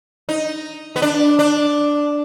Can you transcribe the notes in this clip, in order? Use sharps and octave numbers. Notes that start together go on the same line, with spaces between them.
D#4
B3
D4
D4